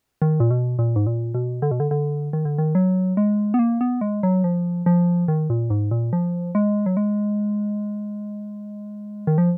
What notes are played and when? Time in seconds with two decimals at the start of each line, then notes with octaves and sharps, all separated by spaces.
0.22 D#3
0.40 A#2
0.51 B2
0.79 A#2
0.96 G#2
1.07 A#2
1.34 B2
1.62 D3
1.71 B2
1.80 D3
1.91 D3
2.33 D#3
2.45 D3
2.58 D#3
2.75 F#3
3.17 G#3
3.54 B3
3.59 A#3
3.81 B3
4.01 G#3
4.23 F#3
4.44 F3
4.86 F3
5.28 D#3
5.50 A#2
5.70 G#2
5.91 A#2
6.13 F3
6.55 G#3
6.86 F#3
6.97 G#3
9.27 D#3
9.38 F3